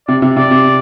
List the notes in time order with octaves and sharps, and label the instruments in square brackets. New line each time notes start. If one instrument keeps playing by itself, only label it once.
[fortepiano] C3 [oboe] D5
[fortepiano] C3
[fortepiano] C3 [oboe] D5
[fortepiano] C3